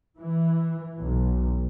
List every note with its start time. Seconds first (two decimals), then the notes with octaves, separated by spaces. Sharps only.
0.19 E3
1.00 B1